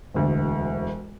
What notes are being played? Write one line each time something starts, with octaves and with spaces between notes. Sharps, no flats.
E1 D2